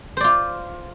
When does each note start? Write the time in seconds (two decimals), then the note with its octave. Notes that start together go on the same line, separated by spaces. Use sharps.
0.17 C5
0.20 D5
0.24 F4